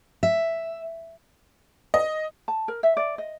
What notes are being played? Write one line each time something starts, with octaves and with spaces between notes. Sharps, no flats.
E5
D#5
A5
A#4
E5
D5
D#5